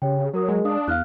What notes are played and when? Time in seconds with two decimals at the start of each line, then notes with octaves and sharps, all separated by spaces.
0.02 C#3 G4 C#5 G5
0.33 F#3 F#4 A#4 D#6
0.49 G#3 A#4
0.65 D4 F5 D#6
0.88 E2 F5 F6 F#6